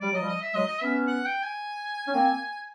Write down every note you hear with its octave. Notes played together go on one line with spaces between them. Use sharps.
G3 D5
F#3 D#5
F3 G3
D#5
E5
F#3 G#3 D#5
D#5
B3 C#4 E5
F#5
G5
G#5
C#4
A#3 C4